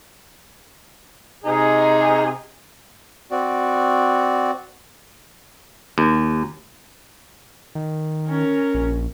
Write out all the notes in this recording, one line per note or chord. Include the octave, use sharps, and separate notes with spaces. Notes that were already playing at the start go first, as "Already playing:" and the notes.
C3 D#4 G#4
C4 F#4 D5
D#2
D#3
C#4 A#4
A#1